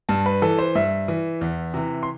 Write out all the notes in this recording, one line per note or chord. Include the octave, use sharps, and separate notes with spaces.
G2 A5
B4
E3 A4
C5
G2 E5
E3
E2
C3 E3
C6